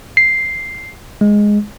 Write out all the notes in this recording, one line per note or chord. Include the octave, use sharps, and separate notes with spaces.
C7
G#3